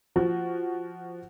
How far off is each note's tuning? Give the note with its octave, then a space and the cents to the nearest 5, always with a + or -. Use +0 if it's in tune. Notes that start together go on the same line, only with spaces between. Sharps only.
F3 -5 F#4 +0